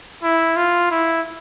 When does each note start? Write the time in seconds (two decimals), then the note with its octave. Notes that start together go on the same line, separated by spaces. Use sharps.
0.23 E4
0.57 F4
0.91 E4